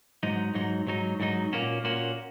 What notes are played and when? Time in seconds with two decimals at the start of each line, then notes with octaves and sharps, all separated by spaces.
0.23 G#2 F#3 D#4
0.55 G#2 F#3 D#4
0.87 G#2 F#3 D#4
1.20 G#2 F#3 D#4
1.53 A#2 A#3 C#4 F#4
1.84 A#2 A#3 C#4 F#4